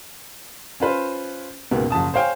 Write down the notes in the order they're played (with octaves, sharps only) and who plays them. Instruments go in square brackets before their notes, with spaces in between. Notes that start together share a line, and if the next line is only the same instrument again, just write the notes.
[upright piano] C#4 F4 B4 C5
C#2 G#2 B2 A#3 B3
F#1 F3 A5 D#6
C5 C#5 F5 G5 G#5